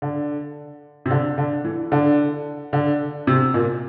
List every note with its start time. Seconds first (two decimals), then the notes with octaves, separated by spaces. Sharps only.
0.02 D3
1.06 C3
1.11 D3
1.38 D3
1.65 E3
1.92 D3
2.73 D3
3.27 C3
3.54 A#2